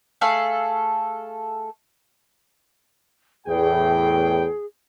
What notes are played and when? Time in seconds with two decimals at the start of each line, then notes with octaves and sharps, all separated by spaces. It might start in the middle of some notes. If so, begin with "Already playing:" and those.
0.21 A3 G#4 A4 F5
3.47 E2 A2 G#4 G5